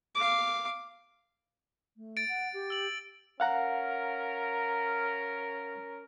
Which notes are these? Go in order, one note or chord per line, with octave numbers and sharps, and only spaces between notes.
F5 D6
A3
A6 D7
F#5
G4
E6 F#7
C#4 A#4 F5 F#5 A#5